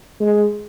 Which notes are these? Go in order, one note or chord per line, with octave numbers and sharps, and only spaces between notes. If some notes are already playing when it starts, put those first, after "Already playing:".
G#3